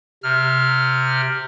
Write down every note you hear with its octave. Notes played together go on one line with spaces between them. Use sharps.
C3 F6